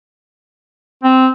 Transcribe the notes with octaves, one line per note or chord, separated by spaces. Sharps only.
C4